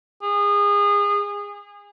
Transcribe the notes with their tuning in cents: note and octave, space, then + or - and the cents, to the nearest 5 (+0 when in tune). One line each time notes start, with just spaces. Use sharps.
G#4 -30